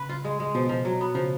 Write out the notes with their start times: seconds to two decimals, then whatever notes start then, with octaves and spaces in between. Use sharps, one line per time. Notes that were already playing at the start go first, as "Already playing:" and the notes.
Already playing: C#3 B4
0.09 F4
0.25 G#3
0.40 G#3
0.55 B2 F3
0.69 F3
0.85 F#3
1.01 B3
1.15 C#3 F3